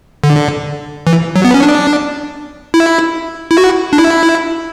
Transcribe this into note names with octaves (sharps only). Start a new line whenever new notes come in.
D3
E3
F#3
B3
C#4
D4
E4
E4
F#4
D4
E4